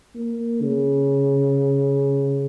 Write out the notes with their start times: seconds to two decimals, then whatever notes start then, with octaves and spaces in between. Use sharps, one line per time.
0.15 A#3
0.62 C#3